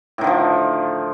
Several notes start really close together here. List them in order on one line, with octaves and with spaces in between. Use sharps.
A2 D#3 D3 F3